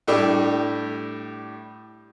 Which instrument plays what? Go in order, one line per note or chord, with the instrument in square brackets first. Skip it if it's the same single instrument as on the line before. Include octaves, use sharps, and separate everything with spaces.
[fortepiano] A2 G3 A3 D4 G4